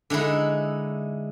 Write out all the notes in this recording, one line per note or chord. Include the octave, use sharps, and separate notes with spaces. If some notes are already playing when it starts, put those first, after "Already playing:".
D3 G#3 D#4 E4